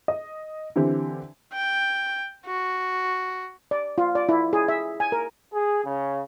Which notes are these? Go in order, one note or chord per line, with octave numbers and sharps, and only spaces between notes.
D#5
D3 E3 C4 G4
G5
F#4
D5
F4
D5
E4
G#4
E5
G#5
A#4
G#4
C#3